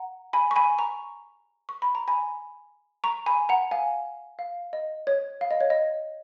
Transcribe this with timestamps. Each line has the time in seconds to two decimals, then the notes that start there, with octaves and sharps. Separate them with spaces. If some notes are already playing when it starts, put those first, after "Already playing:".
Already playing: F#5 A#5
0.33 G#5 B5
0.51 C#6
0.56 G#5 B5
0.78 A#5 C#6
1.69 C#6
1.82 B5
1.95 A#5
2.08 G#5 B5
3.04 A#5 C#6
3.26 G#5 B5
3.49 F#5 A#5
3.71 F5 G#5
4.39 F5
4.73 D#5
5.07 C#5
5.41 F5
5.51 D#5
5.61 C#5
5.70 D#5